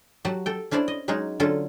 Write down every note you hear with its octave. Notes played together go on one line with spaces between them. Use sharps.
F#3 G4 F#5 A5
A4 G5
C#4 D4 E4 C5 D5
D#5
F#3 G#3 C#4 D#4 G#4 C#5
D3 F#3 C#4 F4 A4